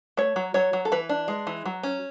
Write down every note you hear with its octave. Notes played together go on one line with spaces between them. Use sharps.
A3 C#5
F#3
F#3 C#5
F#3
A4
E3 B4
D4
G#3
E3
F#3
C#4